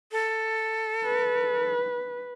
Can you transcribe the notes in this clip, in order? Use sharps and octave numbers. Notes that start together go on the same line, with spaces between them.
A4
B4